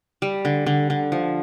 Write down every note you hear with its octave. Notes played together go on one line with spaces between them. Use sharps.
G3
D3
D3
D3
F3